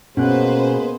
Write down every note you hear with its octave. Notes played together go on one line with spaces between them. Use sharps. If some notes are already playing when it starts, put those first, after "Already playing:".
B2 G#3 A#3 C#4 G#4 B4 C5 F#6